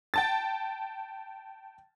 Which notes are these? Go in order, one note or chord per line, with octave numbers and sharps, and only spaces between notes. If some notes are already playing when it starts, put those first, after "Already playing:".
G5 A5 A6